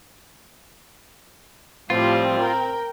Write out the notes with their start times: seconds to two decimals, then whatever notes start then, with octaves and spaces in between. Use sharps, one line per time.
1.90 A2 F3 G3 C4 F4
2.40 A#4 G5